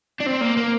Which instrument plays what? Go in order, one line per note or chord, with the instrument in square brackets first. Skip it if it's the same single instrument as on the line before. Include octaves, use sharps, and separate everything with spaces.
[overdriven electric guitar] D4
C4
A#3
A#3